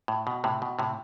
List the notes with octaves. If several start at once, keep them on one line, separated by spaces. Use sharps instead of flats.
A2
B2
A2 C3
B2
A2 C3